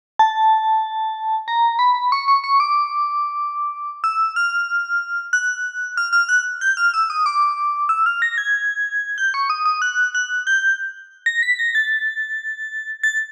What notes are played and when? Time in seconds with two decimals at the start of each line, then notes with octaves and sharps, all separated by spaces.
0.19 A5
1.48 A#5
1.79 B5
2.12 C#6
2.28 C#6
2.44 C#6
2.60 D6
4.04 E6
4.36 F6
5.33 F#6
5.97 F6
6.13 F6
6.29 F#6
6.61 G6
6.77 F6
6.94 E6
7.10 D#6
7.26 D6
7.89 E6
8.06 F6
8.22 A#6
8.38 G#6
9.18 G6
9.34 C#6
9.50 D#6
9.66 D#6
9.82 F#6
10.15 F#6
10.47 G6
11.26 A#6
11.43 B6
11.59 A#6
11.75 A6
13.03 A6